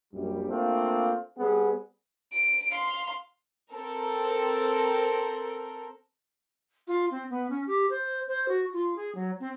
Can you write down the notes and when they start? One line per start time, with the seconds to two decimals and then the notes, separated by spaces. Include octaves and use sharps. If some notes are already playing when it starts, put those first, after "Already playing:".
0.13 A#1 F#2 G3
0.48 A3 A#3 C4 D4 F4
1.38 G3 B3 C4 G#4
2.32 D7
2.72 F5 C6
3.71 C4 A4 A#4
6.87 F4
7.11 C4
7.30 B3
7.50 C#4
7.67 G4
7.90 C5
8.28 C5
8.48 F#4
8.73 F4
8.96 G#4
9.15 F#3
9.40 C4